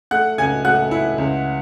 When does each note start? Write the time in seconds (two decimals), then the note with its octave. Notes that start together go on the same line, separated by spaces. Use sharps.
0.11 A3 F#5 F#6
0.38 C#2 G#5 G#6
0.65 A3 F#5 F#6
0.91 E4
1.18 C#2